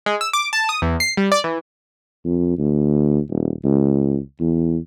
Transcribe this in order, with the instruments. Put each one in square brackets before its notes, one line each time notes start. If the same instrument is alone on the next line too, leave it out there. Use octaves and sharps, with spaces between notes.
[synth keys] G#3
E6
D6
A5
D#6
E2
C7
G3
D5
E3
[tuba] F2
D2
D#1
C#2
E2